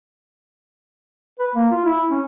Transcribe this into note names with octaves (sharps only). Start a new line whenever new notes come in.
B4
A#3
F4
E4
C#4